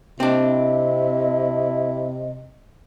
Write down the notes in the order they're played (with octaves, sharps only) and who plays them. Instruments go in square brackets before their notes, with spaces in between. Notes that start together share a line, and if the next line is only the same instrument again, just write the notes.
[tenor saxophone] C3 [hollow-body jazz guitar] C4 D4 [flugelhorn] E4 [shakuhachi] D#5